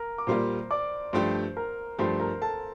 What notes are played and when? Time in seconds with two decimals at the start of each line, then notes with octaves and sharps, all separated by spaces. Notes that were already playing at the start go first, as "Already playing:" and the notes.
Already playing: A#4 A#5
0.18 D6
0.27 A#2 G3 A#3 F4 C5 C6
0.71 D5 D6
1.13 G2 F3 A3 D4 G4 C5 C6
1.57 A#4 A#5
1.99 G2 F3 A3 D4 G4 C5 C6
2.20 A#4 A#5
2.42 A4 A5